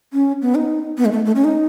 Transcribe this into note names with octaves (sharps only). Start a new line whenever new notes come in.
C#4
B3
D#4
B3
G#3
A3
A3
C#4
D#4